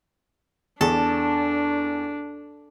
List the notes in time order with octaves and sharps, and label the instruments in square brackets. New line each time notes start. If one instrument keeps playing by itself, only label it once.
[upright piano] E2 [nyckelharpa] D4 [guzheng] A4